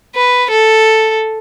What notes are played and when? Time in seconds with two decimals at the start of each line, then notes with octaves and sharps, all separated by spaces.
0.15 B4
0.51 A4